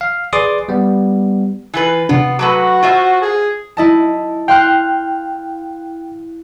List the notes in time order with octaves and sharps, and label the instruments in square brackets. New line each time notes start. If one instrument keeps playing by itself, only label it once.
[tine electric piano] F5
G#4 B4 D5 C6 D6 D#6
G3 B3
[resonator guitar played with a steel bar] E3 F4 B4
[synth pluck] C3 D4 [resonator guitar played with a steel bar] B3 F4
[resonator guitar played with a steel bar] F#3 A3 B4 [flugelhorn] F#4 [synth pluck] D6
[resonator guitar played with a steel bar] F4 C5 E5
[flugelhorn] G#4
[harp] E4 D#5 A5
[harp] F5 C6 F#6 [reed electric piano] G5